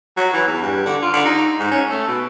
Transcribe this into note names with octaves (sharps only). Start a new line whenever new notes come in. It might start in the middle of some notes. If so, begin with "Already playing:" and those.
F#3
E3
E2
G2
D3
F4
D3
D#4
G#2
C#4
A3
B2